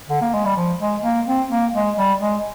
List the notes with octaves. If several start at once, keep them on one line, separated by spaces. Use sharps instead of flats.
D3
A#3
G#3
G3
F3
G#3
A#3
C4
A#3
G#3
G3
G#3